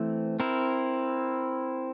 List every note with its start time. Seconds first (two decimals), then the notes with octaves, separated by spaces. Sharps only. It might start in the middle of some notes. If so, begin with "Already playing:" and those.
Already playing: E3 A3 C4
0.40 C4 E4 A#4